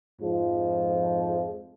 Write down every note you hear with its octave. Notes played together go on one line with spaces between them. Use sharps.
F2 G#2 F3